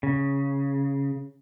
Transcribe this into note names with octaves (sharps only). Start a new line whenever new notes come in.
C#3